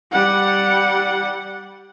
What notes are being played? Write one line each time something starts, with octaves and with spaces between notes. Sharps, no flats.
G3 F#5